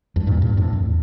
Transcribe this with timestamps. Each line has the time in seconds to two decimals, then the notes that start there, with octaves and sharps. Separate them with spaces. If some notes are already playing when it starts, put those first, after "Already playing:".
0.16 E2 G2
0.27 G2 A#2
0.42 G2 A#2
0.57 F2 A2
0.73 E2